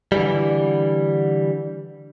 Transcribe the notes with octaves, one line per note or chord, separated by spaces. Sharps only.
D3 E3 G3